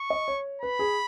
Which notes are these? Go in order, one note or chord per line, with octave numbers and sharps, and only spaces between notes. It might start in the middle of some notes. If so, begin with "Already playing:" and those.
Already playing: C#6
D#5
C#5
B4 B5
G#4